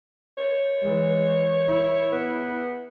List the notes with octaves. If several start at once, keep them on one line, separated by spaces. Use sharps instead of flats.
C#5
E3 G#3
E4
B3